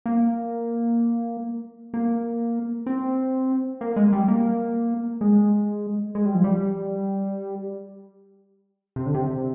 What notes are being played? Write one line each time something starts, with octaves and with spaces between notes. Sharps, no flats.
A#3
A#3
C4
A#3
G#3
G3
A#3
G#3
G#3
G3
F3
G3
C3
D3
C3